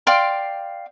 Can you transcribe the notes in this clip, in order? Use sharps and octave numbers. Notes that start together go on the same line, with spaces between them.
D5 F5 G5 C6